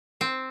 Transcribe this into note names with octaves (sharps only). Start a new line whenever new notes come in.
C4